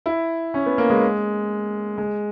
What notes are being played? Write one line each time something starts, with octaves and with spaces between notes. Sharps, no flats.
E4
C#4
B3
A#3
G#3
G#3